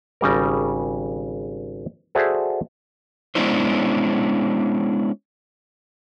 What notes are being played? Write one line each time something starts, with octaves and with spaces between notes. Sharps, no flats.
G#1 C#3 G3 A#4
F#4 G#4 A4 C5 D5 E5
G#3 B3 C#4 D4 E4 C5